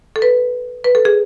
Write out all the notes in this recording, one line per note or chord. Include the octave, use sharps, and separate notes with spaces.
A4
B4
B4
A4
G#4